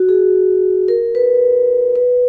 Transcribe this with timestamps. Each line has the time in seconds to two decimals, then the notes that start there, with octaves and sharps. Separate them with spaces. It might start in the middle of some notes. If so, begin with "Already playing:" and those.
Already playing: F#4
0.09 G#4
0.88 A#4
1.15 B4
1.96 B4